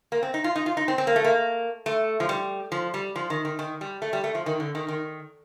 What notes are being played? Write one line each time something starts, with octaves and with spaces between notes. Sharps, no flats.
A#3
C4
D#4
F4
D#4
F4
D#4
C4
C4
A#3
A3
A#3
A3
F3
G3
F3
G3
F3
D#3
D#3
D#3
G3
A3
G3
A3
F3
D#3
D3
D#3
D#3